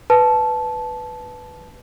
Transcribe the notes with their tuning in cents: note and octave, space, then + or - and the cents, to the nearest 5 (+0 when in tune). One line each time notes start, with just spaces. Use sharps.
B4 +0 A5 -15